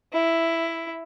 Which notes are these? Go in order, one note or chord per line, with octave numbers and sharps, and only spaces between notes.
E4